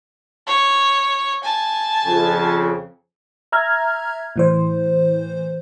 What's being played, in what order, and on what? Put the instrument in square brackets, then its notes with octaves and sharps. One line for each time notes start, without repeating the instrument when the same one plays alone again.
[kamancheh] C#5
G#5 A5
[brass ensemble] F2 C#3
[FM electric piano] E5 A#5 F6 G#6
A2 E3 C5